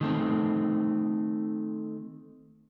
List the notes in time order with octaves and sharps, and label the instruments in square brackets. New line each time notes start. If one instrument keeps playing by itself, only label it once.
[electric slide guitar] D#3 A3 C4